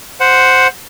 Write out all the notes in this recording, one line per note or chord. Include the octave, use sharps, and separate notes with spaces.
C5 F#5